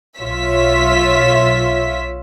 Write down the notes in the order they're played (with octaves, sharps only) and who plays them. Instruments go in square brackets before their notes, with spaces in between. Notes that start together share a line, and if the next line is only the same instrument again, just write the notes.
[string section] B1 F4 C#5 E5 B6